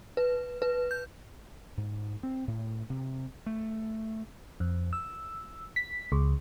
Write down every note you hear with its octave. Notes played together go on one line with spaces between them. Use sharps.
B4
B4
G6
G#2
C4
A2
C3
A3
F2
E6
B6
C#2